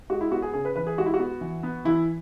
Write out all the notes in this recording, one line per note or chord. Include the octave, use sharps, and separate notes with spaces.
G#3 F#4
E4
B3 F#4
G#4
C#3 G#4
B4
E3 B4
G#4
G#3 F#4
E4
F#4
B3
E3
B3
E3 E4